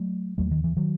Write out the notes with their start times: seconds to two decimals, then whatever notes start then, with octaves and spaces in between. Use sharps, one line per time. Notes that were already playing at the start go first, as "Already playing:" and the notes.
Already playing: F#3 A3
0.38 D#2 F#3 A3
0.51 D#3
0.64 E3
0.76 D#3 F#3